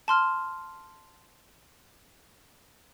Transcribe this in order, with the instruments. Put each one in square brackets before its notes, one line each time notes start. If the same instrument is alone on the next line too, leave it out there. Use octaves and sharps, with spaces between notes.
[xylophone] A5 C6 F6